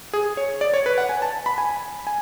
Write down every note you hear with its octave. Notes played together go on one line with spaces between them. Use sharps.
G#4
C#5
D5
C#5
B4
F#5
G#5
A5
B5
G#5
G#5